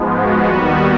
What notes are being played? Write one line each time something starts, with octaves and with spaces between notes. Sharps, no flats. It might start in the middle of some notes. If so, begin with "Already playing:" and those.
Already playing: G#2 F3 G#3 B3
F#4
D#2 D#3 G3 B3